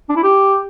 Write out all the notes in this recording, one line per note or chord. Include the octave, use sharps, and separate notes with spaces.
D4
E4
G4